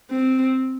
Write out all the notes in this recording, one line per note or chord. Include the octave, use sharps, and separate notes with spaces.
C4